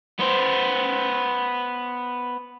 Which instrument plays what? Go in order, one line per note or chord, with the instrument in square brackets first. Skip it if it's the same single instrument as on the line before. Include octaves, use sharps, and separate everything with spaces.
[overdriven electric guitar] B3 C5